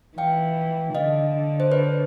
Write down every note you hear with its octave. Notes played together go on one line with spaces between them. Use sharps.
E3 F5 G5
D3 D#5 F5
C5
B4 C#5